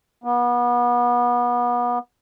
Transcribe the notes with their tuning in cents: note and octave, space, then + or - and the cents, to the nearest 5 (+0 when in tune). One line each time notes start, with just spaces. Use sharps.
B3 -30